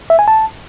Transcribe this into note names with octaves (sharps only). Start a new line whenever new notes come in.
E5
G#5
A5